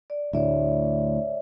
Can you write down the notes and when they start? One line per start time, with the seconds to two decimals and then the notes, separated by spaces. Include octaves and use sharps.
0.10 D5
0.33 D2 A2 C#5 D5 E5